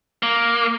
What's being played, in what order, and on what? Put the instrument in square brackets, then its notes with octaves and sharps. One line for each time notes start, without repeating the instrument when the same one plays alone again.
[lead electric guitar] A#3